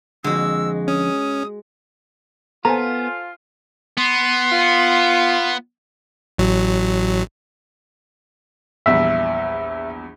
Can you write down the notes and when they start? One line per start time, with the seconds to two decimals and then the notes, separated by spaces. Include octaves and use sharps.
0.24 F2 D3 G#3 F#4 E6
0.88 C#4 D#6
2.65 B3 F4 A4 C5 G#5 A#5
3.97 B3 C6
4.52 F4
6.38 A1 F#3
8.86 A#1 E2 G3 E5